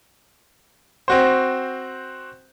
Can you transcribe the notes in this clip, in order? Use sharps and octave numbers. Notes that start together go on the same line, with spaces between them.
C4 F#4 C5